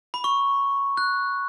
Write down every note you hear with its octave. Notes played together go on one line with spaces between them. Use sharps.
B5
C#6
F#6